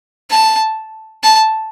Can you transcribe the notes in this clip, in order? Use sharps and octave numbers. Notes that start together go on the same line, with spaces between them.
A5
A5